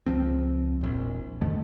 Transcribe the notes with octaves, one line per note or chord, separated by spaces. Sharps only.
C#2 F3 C4
E1 A#1
F2 D3 D#3 A3